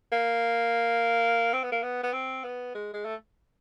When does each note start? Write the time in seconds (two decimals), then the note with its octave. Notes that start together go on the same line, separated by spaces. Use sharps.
0.12 A#3
1.53 C4
1.64 B3
1.72 A#3
1.83 B3
2.04 B3
2.13 C4
2.44 B3
2.75 G#3
2.94 G#3
3.05 A3